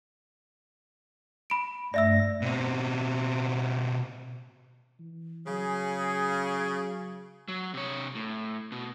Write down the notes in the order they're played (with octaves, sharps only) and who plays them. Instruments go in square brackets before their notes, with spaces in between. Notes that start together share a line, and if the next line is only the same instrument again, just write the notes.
[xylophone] B5 D7
[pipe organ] G2 A3 A#6 [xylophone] D5 E5 E6
[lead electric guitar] B2 C4
[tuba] E3
[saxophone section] C#3 [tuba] F#3 [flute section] G#4
[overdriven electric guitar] F#3
C3 C#5
A2
B2